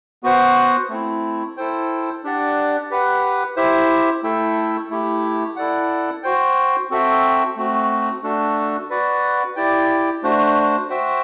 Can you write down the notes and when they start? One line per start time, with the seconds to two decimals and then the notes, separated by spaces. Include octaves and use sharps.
0.23 B3 F#4 C5 F#5
0.89 A3 C4 E4
1.57 E4 A4 C5 G5
2.24 D4 G4 D5 F#5
2.90 G4 B4 F#5
3.56 E4 G4 C5 E5
4.23 A3 E4 A4 E5 G5
4.90 A3 E4 G4
5.56 E4 A4 D5 F#5
6.23 F#4 C5 G5
6.90 C4 F#4 A4 E5 G5
7.56 A3 C4 F#4
8.23 A3 D4 F#4 A4
8.90 F#4 B4 D5 F#5
9.56 E4 G4 D5 G5
10.23 A3 D4 F#4 C5
10.89 F#4 C5 E5 G5